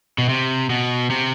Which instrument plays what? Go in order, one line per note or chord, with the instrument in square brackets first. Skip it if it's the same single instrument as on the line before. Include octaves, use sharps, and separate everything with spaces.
[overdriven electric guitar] B2
C3
B2
C3